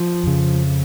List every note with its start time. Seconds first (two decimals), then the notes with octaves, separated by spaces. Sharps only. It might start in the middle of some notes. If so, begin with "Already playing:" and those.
Already playing: F3
0.23 F2 C#3